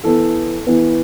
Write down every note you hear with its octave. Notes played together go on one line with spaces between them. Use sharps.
E3 B3 A4
E3 B3